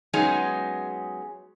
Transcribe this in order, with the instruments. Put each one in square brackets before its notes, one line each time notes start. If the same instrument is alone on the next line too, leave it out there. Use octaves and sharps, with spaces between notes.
[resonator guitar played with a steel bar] F#3 G#3 B3 C#4 D#4 G#4